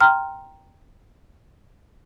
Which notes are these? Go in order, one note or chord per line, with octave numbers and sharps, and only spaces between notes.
G5 A#5 C6 F6